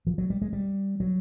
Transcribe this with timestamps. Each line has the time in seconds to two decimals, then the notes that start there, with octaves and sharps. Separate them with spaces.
0.07 F3
0.18 F#3
0.30 G3
0.42 G#3
0.53 G3
1.00 F#3